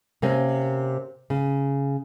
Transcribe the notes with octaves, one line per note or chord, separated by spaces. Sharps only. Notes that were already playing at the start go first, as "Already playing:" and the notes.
C3 A#3 C4 C#4
C#3